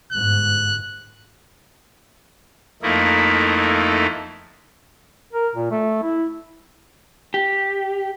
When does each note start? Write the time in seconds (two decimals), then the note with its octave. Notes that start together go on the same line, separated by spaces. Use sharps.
0.12 G1 G#2 F#6
2.82 F2 A3 A#3 D#4 E4
5.32 A#4
5.55 A#2
5.71 A3
6.03 E4
7.34 G4